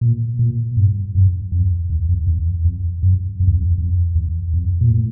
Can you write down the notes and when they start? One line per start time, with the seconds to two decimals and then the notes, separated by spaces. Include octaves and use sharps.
0.01 A#2
0.39 A#2
0.77 G2
1.15 F#2
1.52 F2
1.90 E2
2.09 F2
2.27 E2
2.65 F2
3.03 F#2
3.40 F2
3.48 E2
3.55 F2
3.78 F2
4.15 E2
4.53 F2
4.81 A#2
4.91 A2